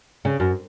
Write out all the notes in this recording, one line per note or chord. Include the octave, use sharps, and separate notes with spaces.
C#3
F#2